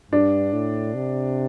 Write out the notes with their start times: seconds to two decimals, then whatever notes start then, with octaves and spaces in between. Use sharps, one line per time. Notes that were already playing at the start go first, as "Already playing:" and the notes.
0.12 G2 D4
0.53 A2
0.95 C3